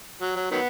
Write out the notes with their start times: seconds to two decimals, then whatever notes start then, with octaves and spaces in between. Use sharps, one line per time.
0.21 F#3
0.36 F#3
0.51 D#3 F#3 B3